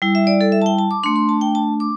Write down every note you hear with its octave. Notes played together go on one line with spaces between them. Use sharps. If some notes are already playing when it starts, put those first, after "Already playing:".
G3 E4
E5
D5
A4
E5
A5
G5
A5
D6
A3 D4 C6
C6
A5
G5
A5
D6